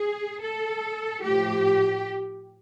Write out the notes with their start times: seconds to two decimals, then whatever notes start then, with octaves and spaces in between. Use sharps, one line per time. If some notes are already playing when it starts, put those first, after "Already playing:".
Already playing: G#4
0.41 A4
1.22 A2 F3 G4